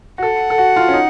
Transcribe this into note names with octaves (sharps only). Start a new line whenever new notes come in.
F#4
A4 F#5
A4
F#4
F4
C#4
D#4